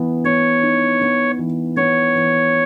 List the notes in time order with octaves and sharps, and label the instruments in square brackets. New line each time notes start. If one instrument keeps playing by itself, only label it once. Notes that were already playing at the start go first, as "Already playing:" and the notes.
Already playing: [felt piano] E3 B3
[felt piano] B3 [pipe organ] C#5
[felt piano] D#4
B3
E3
[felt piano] B3 [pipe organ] C#5
[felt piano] E3